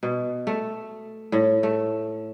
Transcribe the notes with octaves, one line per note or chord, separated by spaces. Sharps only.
B2
A3
A2
A3